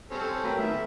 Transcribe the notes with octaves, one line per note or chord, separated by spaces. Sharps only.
G3 C4 C#4 A4
A1 F#3 A#4 B4 G5
A2 D#3 B3 E5
A4